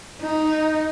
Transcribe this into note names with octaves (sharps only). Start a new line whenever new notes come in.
D#4